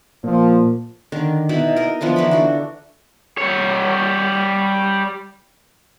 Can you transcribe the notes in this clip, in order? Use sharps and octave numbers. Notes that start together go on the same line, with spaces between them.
A#2 F3
D3 D#3 D4
B2 D#4 E4 B5
A#4 D#5
E3 F3 B3 D4
D3 E3 D#4 B5
D4 F#4 A4
G3 C#5